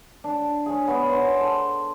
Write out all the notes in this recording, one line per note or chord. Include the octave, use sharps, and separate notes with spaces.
D4
G#4 C#5
B3 C#5
C5 F#5 C6
A4